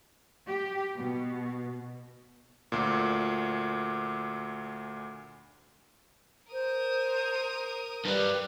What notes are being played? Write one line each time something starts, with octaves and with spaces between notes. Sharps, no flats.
G4
B2
D2 A#2
A#4 C5 D#6
G2 G3 B4